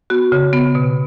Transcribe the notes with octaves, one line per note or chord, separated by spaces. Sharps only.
B3 F#4
C#3
B3
B2